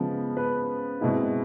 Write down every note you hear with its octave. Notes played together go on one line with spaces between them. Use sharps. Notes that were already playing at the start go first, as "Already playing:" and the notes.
Already playing: C#3 F3 G#3 B3
B4
B2 G#3 C4 E4